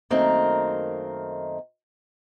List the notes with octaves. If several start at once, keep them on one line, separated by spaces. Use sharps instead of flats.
F#2 D#3 A3 A#3 C4 A#4